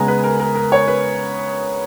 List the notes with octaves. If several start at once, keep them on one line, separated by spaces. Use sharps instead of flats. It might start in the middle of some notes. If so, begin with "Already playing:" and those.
Already playing: C#3 G#3 B3 G#5 A#5
B4
A#4
A#4
A#4
C#5
B4